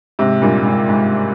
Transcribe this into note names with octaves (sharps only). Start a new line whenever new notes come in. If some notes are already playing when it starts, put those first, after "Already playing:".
G#2 C3
G2 A#2
G#2
G#2